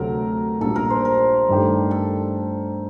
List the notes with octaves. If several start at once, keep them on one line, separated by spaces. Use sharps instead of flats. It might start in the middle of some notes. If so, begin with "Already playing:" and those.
Already playing: D2 C3 F#3 A3 A#4
A#1 A#2 G3 A#3 D4 A4
A#4
C5
A#4
G2 D#3 A3 D4 G4
A4